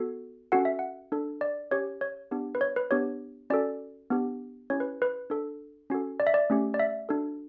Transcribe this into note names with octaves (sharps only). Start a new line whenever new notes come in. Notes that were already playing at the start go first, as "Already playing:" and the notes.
Already playing: B3 F#4 A4
C#4 F#4 A4 F#5
E5
F#5
D4 A4
D5
C#4 G4 C#5
C#5
B3 D4 G4
B4
C#5
B4
B3 D4 G4 C#5
C#4 F#4 A4 D5
B3 D4 G4
C#4 E4 G4 C#5
B4
B4
D4 A4
C#4 F#4 A4
D5
E5
D5
A3 C#4 G4
D5
E5
D4 F#4 A4